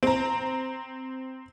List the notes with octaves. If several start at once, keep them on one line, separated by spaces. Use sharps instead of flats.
C4 A#5